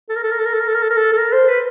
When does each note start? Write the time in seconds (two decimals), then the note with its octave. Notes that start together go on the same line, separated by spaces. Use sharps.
0.09 A4
0.16 A#4
0.23 A4
0.31 A#4
0.39 A4
0.46 A#4
0.53 A4
0.60 A#4
0.68 A4
0.75 A#4
0.82 A4
0.90 A#4
0.97 A4
1.13 A4
1.18 A#4
1.33 C5
1.49 B4